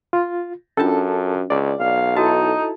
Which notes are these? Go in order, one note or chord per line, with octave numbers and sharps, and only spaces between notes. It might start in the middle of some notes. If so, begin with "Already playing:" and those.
F4
F#2 C#4 D4 F4 A4 A5
C#2 D5
B1 F5
D#4 E4 F#4 A4 A5